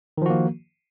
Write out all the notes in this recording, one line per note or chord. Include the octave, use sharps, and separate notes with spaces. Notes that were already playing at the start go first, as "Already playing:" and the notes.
D#3 F3 A#3 F#4